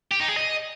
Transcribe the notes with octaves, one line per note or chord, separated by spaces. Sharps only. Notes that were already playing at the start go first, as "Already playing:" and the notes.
G4
D#4
G#4
D#5